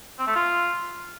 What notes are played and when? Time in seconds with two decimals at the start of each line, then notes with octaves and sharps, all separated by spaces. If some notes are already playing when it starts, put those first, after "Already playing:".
0.19 C4
0.27 A3
0.35 F4